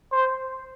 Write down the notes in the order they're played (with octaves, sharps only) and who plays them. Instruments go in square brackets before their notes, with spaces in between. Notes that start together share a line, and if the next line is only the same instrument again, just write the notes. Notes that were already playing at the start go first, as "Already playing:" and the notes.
[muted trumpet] C5